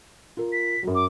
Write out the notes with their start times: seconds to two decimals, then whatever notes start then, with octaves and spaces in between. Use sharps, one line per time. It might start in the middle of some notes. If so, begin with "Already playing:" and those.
0.37 F4 A#4
0.53 B6
0.83 F#2 F#3
0.95 D6